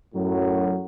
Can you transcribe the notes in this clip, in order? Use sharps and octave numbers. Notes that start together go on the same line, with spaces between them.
F#2 A2 F#3